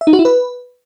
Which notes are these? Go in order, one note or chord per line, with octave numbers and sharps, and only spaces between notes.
E5
D#4
F#4
E4
B4